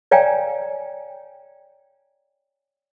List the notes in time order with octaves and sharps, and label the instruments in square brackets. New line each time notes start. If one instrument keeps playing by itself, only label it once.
[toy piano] C#5 D5 F5 G5 G#5 A#5